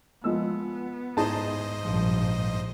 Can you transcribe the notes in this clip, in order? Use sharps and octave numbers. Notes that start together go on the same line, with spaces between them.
F3 G#3 B3 E6
G#2 D#4 G#4 C5 D#5 A5
A#1 G2 A#2 F3